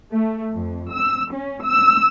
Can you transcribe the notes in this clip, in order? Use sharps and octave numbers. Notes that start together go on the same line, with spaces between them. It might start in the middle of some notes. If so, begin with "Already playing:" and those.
A3
F2
E6
C#4
E6